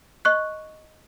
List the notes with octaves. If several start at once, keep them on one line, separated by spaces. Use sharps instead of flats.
D#5 C#6 F#6